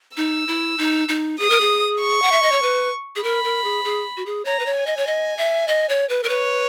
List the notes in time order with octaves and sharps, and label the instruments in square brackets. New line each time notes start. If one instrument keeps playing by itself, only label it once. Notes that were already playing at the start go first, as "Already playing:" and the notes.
[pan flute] D#4 [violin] E6
[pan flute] E4
D#4
D#4
[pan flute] G#4 [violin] D#6
[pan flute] A#4
G#4
[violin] C#6
[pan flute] F#5
E5
D#5
C#5
B4
G#4
[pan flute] A#4 [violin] B5
[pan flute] A#4
G#4
G#4
F#4
G#4
[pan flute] C#5 [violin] A#5
[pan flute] B4
C#5
[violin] G#5
[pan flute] D#5
C#5
D#5
E5
D#5
C#5
B4
A#4
[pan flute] B4 [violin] C#5